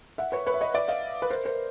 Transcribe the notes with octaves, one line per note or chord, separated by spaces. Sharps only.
E5 F#5
B4 C#5
B4 C#5
E5
C#5 D#5
D5 E5
D#5 F5
B4
A#4 C5
A#4 C5